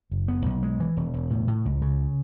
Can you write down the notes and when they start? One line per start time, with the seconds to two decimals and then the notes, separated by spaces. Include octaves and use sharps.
0.12 F#1
0.28 B3
0.46 B1
0.63 G#3
0.80 E3
0.97 E1
1.14 E1
1.31 A2
1.47 A2
1.65 C#2
1.82 C#3